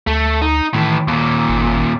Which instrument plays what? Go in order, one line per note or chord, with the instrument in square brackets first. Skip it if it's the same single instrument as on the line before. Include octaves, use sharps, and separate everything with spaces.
[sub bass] D2 [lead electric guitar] A3
[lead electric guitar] D#4
[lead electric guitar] A2 E3 [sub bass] D#3
[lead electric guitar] D#2 A#2
[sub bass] G1